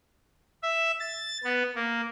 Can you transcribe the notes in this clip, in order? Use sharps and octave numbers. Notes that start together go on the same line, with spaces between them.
E5
A6
B3
A#3